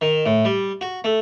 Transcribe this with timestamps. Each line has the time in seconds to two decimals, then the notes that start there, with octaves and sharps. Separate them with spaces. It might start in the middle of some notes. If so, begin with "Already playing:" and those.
0.01 D#3
0.26 A2
0.45 G3
0.81 F#4
1.04 A3